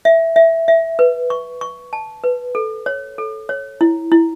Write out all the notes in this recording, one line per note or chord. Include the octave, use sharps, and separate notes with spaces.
E5
E5
E5
B4
C#6
C#6
A5
B4
A4
C#5
A4
C#5
E4
E4